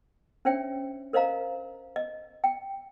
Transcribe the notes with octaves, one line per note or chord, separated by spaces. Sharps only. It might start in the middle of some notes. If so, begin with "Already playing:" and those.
C#4 D4 C5 C#5 E5 G5
A#4 C5 D#5 F5 A#5
D#5
G5